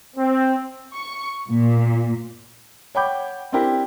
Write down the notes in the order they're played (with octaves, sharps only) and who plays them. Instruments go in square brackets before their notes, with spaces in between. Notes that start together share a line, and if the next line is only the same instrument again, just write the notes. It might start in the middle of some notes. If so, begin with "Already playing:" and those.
[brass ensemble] C4
[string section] C#6
A#2
[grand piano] C#5 F#5 G5 B5 D6 G6
C4 D4 E4 G4 A#4